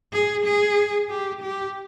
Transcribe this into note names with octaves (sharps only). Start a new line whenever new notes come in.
G#4
G#4
G4
G4